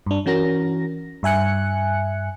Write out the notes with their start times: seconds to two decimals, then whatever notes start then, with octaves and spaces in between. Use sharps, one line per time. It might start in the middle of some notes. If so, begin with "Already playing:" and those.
0.06 G2 D4
0.26 E3 C#4 F#4 A#4 A#6
1.23 G2 E5 G#5 F#6 C#7